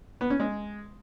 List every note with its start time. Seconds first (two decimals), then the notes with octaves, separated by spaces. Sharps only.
0.21 B3
0.30 C#4
0.40 G#3